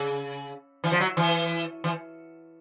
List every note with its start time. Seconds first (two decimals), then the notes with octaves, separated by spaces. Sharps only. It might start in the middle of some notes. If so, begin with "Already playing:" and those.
Already playing: C#3
0.84 E3
0.92 F3
1.00 F#3
1.17 E3
1.84 E3